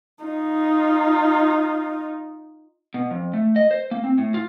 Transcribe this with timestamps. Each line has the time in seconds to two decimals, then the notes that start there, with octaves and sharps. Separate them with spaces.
0.24 D#4 F4
2.94 B2
3.11 F2
3.33 A3
3.56 D#5
3.71 C5
3.91 A#3
4.04 C4
4.18 A2
4.34 F4